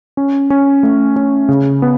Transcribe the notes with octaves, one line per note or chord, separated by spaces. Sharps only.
C#4
C#4
A3
C#4
C#3
B3